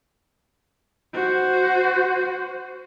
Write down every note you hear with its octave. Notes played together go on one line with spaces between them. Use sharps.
F#4 C5